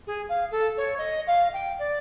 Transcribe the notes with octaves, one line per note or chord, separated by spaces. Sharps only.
G#4
F5
A4
C#5
D#5
F5
G5
D5